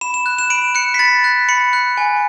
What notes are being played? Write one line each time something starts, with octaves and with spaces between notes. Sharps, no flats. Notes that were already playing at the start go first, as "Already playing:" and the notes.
B5 E7
E7
F#6
E7
B5 D7
F#6 C#7
B6
B5 A6
F#6
B5 C#7
F#6
G#5